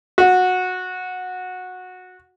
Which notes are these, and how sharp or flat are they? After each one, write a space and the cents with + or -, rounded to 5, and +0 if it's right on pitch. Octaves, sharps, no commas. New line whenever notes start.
F#4 -15